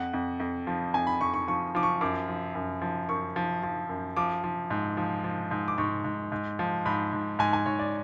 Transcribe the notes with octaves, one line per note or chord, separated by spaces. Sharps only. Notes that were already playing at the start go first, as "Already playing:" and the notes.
Already playing: F2 F#5
F2
F2
F3
F2 G#5
B5
F2 C#6
C#6
F3 C#6
F3 D6
C#6
F#2 D6
F3
F#2
F3
F#2 C#6
F3
F3
F#2
F3 D6
F3
G#2
F3
F3
G#2
D6
G#2 C#6
G#2
G#2
F3
G#2 B5
G#2
G#2 G#5
G#5
G#2 C#5
D5